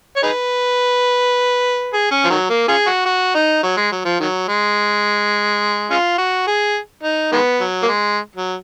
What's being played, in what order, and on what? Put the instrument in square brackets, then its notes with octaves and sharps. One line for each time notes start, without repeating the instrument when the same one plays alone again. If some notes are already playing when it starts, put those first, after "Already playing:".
[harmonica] C#5
D#4 G#4 B4
G#4
C#4
F3
D#3 F#3
A#3
C#4 F4 G#4
F#4
F#4
D#4
F#3
G#3
F#3
F3
D#3 F#3
G#3
G#3 C#4 F4
F#4
G#4
D#4
D#3 G#3 B3
F#3
A#3
G#3
F#3